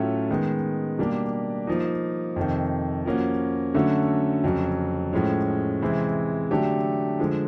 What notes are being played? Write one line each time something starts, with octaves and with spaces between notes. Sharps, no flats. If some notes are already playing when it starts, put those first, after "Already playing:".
Already playing: A2 F#3 A3 C#4 F4
D#3 G#3 B3
B2 G3 A#3 D4 G4
F3 A#3 D#4
F2 C3 D#3
F3 A#3 C#4 F#4
D3 F#3 A3 C#4 F#4
F2 C#3 F#3
A2 F3 G#3 C#4
C3 E3 G#3 C4
D3 F#3 A3 D4 G4
D3 F3 G#3